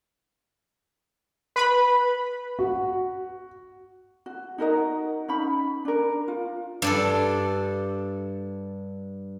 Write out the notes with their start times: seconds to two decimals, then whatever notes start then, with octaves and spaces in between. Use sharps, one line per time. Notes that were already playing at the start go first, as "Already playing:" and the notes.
1.56 B4 B5
2.59 F#4
4.26 F#4
4.58 D#4 F#4 A#4 D#5
5.28 C#4 D#4 B5
5.85 D4 A#4
6.28 F4
6.82 G2 D4 A4